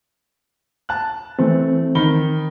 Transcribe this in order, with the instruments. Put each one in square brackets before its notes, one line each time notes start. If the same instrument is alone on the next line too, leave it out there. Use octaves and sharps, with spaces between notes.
[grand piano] A5 F#6
[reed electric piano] E3 C4 [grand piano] A3
[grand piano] D#3 B5 G7